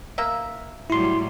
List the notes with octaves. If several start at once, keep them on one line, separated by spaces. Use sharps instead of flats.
A#3 E5
A2 F#3 G3 E4 C6